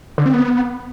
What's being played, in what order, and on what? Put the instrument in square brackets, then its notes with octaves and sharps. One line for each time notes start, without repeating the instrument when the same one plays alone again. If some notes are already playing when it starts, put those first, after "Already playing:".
[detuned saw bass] D3
C4
B3